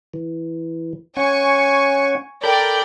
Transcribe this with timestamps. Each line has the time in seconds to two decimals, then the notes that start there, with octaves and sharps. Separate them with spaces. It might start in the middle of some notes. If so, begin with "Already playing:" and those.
0.14 E3
1.17 C#4 F#5 G#5 C#6
2.44 A4 A#4 D5 G5 B5 G6